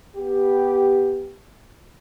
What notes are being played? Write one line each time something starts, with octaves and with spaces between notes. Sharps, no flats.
B3 G4